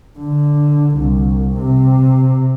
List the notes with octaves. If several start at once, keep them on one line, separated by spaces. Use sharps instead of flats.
D3
C2
C3